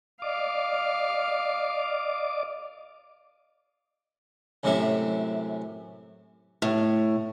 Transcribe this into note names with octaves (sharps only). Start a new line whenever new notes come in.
D5 D#5 F5 D6
F#2 A2 C3 C#4 E5
A2